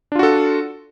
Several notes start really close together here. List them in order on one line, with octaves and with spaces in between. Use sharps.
D4 F4 F#4 A4